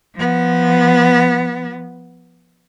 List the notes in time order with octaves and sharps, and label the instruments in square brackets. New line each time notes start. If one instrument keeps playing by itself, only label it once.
[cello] F3 B3